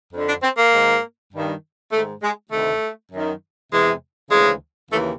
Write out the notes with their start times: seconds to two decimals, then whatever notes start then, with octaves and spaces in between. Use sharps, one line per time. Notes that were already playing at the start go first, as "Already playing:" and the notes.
0.13 F2 D3
0.28 D4
0.43 C4
0.57 A#3
0.72 G#2 D#3
1.32 G2 D#3
1.92 G#2 D#3 A3
2.22 G#3
2.52 D2 C3 D#3 A3
3.11 F#2 D#3
3.71 E2 C3 E3 G#3
4.31 D2 C#3 E3 G#3
4.90 D#2 C#3 E3 A3